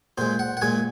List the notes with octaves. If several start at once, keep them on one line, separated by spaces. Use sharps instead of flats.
A#2 G#3 C5
F#5
F#5
A#2 G#3 G#5